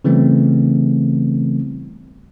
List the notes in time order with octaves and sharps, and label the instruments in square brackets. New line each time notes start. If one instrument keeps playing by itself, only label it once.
[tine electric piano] C#3 E3 G3 A3 B3 C4